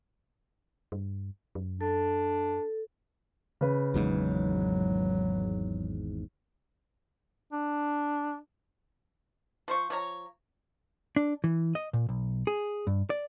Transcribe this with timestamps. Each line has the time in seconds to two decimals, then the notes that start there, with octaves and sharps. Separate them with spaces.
0.92 G2
1.55 F#2
1.81 D4 A4
3.61 C#3 B4
3.94 G#1 E2 G#2 F#3
7.52 D4
9.68 F3 C5 C#6
9.90 F3 C#5 A#5
11.16 D4
11.44 E3
11.75 D#5
11.93 A#2
12.09 B1
12.47 G#4
12.87 G2
13.10 D5